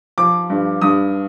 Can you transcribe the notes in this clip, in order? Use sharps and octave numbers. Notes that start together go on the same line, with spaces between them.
F3 D6
G2
G2 D#6